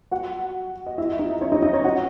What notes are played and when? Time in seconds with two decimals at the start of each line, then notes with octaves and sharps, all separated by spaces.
0.11 F#4 F#5
0.86 D#5
0.98 E4 E5
1.19 D#4 D#5
1.41 C#4 C#5
1.52 D#4 D#5
1.62 D#4 D#5
1.73 C#4 C#5
1.84 F#4 F#5